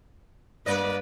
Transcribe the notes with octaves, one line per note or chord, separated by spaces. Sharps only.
G2 A#3 B4 D5 D#5